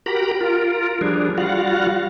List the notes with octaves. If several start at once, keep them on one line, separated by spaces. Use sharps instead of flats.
F#4 G4 A#4 A#5 B5
F4 A#4
F3 G3 D4 G#4
G3 F4 F#4 F5 F#5